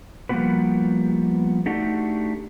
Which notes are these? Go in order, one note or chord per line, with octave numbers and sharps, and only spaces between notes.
F3 G3 A#3 B3 F#4 B4
A3 D4 D#4 F#4 G4 A4